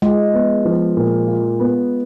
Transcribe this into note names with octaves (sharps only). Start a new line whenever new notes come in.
G#3 F4
B3
F3
A#2
F4
B3